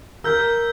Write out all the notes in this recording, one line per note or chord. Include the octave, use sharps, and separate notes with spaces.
A#4 E6 G6 B6 G7